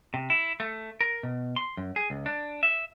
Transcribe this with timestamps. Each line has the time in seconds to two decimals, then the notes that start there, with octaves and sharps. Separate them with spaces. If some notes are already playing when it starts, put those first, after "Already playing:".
0.14 C3
0.30 E4
0.60 A3
1.01 A#4
1.23 B2
1.56 C6
1.77 F#2
1.96 G#4
2.10 C#2
2.26 D4
2.63 E5